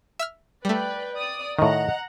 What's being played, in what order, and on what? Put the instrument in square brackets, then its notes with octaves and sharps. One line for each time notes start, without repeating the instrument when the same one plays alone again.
[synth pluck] E5 E6 F6
[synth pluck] G3 A3 [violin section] B4 D5 G5
[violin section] D5 D#6
[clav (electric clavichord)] A2 D#3 [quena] D#5 [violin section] F#5 A#5